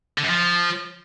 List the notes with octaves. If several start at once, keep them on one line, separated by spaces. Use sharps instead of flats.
D3
F#2
F3